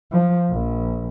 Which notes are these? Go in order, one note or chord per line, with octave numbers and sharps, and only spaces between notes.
F3
A#1